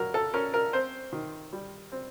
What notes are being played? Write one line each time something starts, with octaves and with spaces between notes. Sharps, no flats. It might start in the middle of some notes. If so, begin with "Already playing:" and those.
Already playing: F#3 A#4
A4
C#4 A#4
A#4
C4 C5
D#3
G3
C4